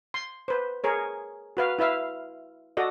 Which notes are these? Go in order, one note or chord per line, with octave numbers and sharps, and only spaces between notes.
C6
B4 C5
G#4 A#4 C#5
F#4 B4 F5
E4 B4 E5 F5
F#4 A4 D5 D#5